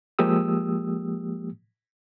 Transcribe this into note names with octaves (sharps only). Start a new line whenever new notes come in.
F3 G#3 A#3 G4 D#6 E6